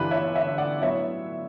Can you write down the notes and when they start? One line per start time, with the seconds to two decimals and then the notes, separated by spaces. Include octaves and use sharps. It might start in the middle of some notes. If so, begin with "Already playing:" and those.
Already playing: G1 G2 E3 G3 D4 G4 B4
0.11 C#5 E5
0.34 C#5 E5
0.58 D5 F#5
0.81 A2 F#3 B3 E4 C#5 E5